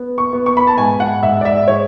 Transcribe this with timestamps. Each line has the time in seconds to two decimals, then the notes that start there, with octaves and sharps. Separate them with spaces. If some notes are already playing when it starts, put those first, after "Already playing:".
Already playing: B3
0.18 C#6
0.33 B3
0.46 C#6
0.57 B5
0.67 A5
0.78 G#2 G#5
1.00 F#5
1.23 G#2 E5
1.41 D5
1.45 E5
1.68 G#3 C#5